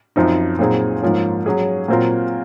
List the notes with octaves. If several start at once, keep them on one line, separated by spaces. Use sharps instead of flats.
F#2 F3 C4 D#4
A#2 F#3 C4 D#4 G#4
G#2 F3 A#3 C#4
F#3 C#4 G#4
A#2 F#3 C4 F4 A#4